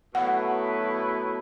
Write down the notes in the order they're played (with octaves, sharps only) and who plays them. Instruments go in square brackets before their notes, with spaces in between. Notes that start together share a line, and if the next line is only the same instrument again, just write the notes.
[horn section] B2 F#3 A3 E4 B4 [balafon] F#5